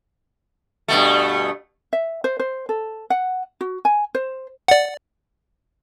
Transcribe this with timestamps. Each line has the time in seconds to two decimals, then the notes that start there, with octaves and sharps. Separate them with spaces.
0.88 G2 B2 A3
1.93 E5
2.24 C5
2.40 C5
2.69 A4
3.10 F#5
3.61 F#4
3.85 G#5
4.15 C5
4.68 D5 F#5